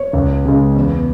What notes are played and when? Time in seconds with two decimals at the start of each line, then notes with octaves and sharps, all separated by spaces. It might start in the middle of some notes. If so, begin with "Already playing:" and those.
Already playing: C#5
0.13 C#2
0.45 C#3 G#3
0.76 E2